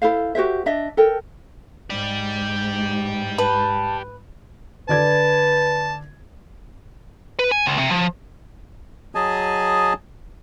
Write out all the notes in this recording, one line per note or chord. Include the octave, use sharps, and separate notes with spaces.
E4 A4 C5 F5
F#4 G4 C5 E5
D4 D#5 E5
A4 A#4 G5
G#2 G4 D5
B4 A5
D3 B4 D5 A5 G#6
B4
G#5
C#2
C3
F3
F#3 G#4 D#5 G#5 A5